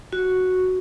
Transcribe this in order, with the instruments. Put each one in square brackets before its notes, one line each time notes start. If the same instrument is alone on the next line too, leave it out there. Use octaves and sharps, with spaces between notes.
[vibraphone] F#4